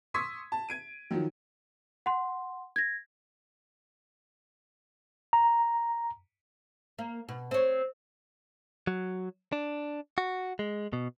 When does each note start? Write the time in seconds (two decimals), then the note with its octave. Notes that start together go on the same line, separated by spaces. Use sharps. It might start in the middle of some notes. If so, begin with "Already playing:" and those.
0.14 C6 C#6 D#6 E6 G#6 B6
0.52 A5
0.69 G#6 D7 D#7
1.11 D#3 F3 F#3
2.06 F#5 C6
2.76 G#6 A#6
5.33 A#5
6.98 A#3
7.29 B2
7.51 C4 C#5
8.87 F#3
9.53 D4
10.18 F#4
10.59 G#3
10.93 B2